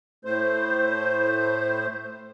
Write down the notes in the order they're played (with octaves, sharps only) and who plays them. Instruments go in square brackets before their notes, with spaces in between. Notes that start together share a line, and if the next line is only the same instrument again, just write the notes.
[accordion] A2 A3 C5